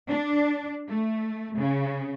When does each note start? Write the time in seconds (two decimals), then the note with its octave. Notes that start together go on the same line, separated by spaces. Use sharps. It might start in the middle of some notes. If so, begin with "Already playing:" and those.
0.10 D4
0.89 A3
1.57 C#3